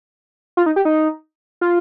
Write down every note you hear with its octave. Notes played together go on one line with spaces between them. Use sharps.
F4
D#4
G4
D#4
F4